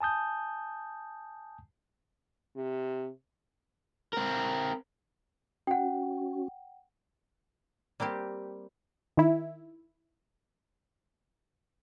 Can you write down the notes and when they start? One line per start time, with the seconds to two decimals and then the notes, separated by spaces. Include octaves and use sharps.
0.01 G#5 A5 D#6 G6
2.56 C3
4.13 C4 A#4
5.67 C#4 F#4 F#5 G5
8.00 G3 A#3 C4 G4
9.17 D#3 E4